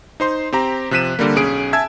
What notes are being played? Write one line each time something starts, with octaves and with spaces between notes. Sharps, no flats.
D#4 C5 C6
C4 G4 A#5
C3 F3 F#6 B6 D#7 E7
D3 G3 A#3
B1 C#4 G#4 D7
E5 G#5 A5 E6 G#6